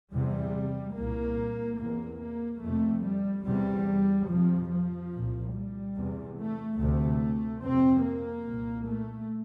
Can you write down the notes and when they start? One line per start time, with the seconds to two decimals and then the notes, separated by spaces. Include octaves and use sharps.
0.12 E2 C3 G3
0.96 C2 A#2 A#3
1.79 E2 C3 A#3
2.20 A#3
2.62 F2 C3 A3
3.04 G3
3.46 E2 C3 G3
4.29 F2 C3 F3
4.70 F3
5.13 C2 A#2
5.54 G3
5.95 E2 C3
6.37 A3
6.79 D2 C3 A3
7.62 F2 C3 C4
8.04 A#3
8.46 C2 A#2
8.87 A3